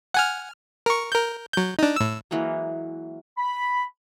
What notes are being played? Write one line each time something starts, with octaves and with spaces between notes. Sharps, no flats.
F#5 G#5 F6
A#4 C#6
A#4 G6
F#3 G6
D4 D#4
A2 E6
E3 F#3 G#3 A#3
B5